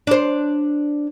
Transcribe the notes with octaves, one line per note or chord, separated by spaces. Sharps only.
D4 C5